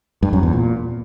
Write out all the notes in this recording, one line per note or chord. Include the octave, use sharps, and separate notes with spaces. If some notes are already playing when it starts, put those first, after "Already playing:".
G2
F#2
E2
A#2